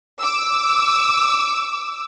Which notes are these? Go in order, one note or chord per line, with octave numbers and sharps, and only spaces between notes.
D6 E6